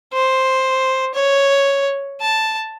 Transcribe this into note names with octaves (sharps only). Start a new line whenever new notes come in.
C5
C#5
A5